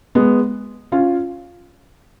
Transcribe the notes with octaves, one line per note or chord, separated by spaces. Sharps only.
G#3 B3
C#4 F4